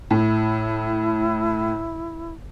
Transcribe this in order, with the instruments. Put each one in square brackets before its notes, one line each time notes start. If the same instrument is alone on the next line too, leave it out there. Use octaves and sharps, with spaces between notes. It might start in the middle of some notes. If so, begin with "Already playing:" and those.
[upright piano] A2 [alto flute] E4